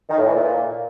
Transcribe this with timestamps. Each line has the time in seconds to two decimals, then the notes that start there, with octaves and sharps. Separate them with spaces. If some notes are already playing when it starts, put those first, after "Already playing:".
0.10 D#3
0.18 A2
0.26 E3
0.34 A#2